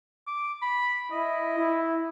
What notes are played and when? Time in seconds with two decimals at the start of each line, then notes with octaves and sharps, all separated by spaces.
0.27 D6
0.62 B5
1.12 E4 D#5
1.58 E4